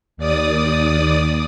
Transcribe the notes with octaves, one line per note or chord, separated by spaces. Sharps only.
D#2 D5 D#6